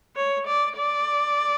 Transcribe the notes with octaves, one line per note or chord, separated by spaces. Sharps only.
C#5
D5
D5